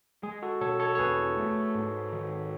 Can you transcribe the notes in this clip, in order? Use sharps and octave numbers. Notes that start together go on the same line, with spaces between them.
G#3 G#4
F#4 A4
B2 A4 C#5
A4 C#5
C#5
E2 G#4 B4
A3
G#2
D#3